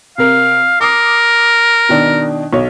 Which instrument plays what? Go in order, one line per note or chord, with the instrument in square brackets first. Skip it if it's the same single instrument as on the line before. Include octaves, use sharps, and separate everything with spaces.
[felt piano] C3 A#4 [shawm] F5
[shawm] A#4 [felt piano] D6 D#6 C7
[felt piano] B2 D#3 D4
B1 C#5